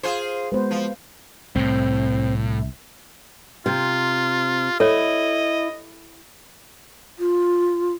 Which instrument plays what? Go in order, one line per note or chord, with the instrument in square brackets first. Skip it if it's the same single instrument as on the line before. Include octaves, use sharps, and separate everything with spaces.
[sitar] F4 G#4 C5
[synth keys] G#3 B3 F#4 [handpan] B4 C5
[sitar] F3
[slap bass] C2 [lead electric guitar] A2 [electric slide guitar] C4
[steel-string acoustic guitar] C3 [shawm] F4
[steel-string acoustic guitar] E4 [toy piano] A4 C#5 [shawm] D#5
[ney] F4